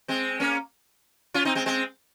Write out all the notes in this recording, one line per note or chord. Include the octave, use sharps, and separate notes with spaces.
G#3 C4
A#3 C#4
C#4 F4
C4 D#4
G#3 C4
G#3 C4